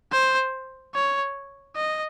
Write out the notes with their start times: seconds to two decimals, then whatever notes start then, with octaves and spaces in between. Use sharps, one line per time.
0.12 C5
0.95 C#5
1.76 D#5